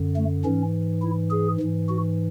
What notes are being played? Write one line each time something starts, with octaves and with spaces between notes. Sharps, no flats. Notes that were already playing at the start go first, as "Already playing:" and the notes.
Already playing: F#2 D3
A3
G#2 E3 C#4
E4
G#4
G#2 E3
F#4